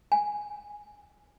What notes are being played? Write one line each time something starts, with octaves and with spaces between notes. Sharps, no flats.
G#5